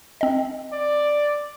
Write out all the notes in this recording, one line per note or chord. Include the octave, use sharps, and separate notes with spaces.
C4 D#5
D5